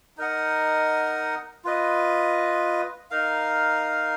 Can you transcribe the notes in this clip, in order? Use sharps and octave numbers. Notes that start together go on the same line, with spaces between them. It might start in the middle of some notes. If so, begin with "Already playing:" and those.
D#4 A#4 D#5 F#5
F4 B4 D#5
D#4 A#4 F5